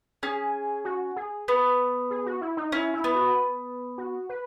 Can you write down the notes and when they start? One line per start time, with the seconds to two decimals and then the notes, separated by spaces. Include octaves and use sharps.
0.23 C#4 G#4
0.85 F#4
1.16 G#4
1.48 B3
2.10 G#4
2.26 F#4
2.41 E4
2.57 D#4
2.72 C#4 E4
2.94 E4
3.04 B3
3.15 F#4
3.98 F#4
4.29 B4